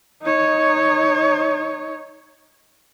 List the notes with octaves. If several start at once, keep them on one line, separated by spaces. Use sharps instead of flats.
D#4 C#5